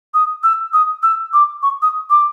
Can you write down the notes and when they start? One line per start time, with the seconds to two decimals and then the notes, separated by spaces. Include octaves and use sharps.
0.14 D#6
0.43 E6
0.73 D#6
1.03 E6
1.33 D6
1.63 C#6
1.82 D#6
2.10 D6